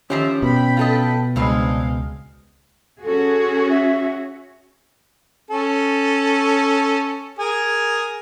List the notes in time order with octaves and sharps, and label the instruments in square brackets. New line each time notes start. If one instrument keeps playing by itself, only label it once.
[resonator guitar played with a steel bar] D#3 F3 G4 [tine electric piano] C#4 [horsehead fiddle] E5
[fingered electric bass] B2 [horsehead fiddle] G5 B5
[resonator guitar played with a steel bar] F4 A4 D#5
[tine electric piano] C#2 [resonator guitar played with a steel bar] G2 C4 [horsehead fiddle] G#3 F5
[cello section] C#4 F#4 G#4 [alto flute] A4
[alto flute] E5
[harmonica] C#4 A4
G#4 A#4 G#5